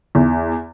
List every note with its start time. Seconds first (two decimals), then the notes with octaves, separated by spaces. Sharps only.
0.15 E2